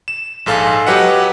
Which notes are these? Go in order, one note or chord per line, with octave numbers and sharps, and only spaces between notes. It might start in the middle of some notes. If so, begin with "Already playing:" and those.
E7
A#1 G#2 A4 F5 G#5
F#3 G4 B4 D#5 F#5